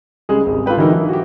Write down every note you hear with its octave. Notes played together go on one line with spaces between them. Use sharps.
C#3 G3 G#3 G#4
G#1
F4 G4 A4 B4 G5
D3 E3 F#3 D#4 A#4
E3
F#4 G4